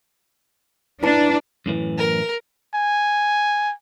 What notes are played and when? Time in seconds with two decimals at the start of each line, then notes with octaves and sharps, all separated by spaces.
1.03 D4 E4 B4 A5
1.66 F#2 A2 E3
1.98 A#4
2.75 G#5